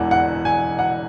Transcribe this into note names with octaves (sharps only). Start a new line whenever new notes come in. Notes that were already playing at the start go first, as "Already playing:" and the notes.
Already playing: E1 E2 E3 F#5
F#5
G#5
F#5